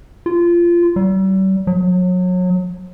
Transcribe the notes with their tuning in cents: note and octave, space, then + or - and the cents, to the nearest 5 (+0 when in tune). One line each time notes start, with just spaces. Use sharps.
F4 -20
G3 -45
F#3 -30